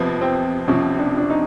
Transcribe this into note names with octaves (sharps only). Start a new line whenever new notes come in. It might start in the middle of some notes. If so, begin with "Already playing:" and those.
Already playing: F2 C3 F3 B3
C4
F2 C3 F3 C#4
D4
D4
D#4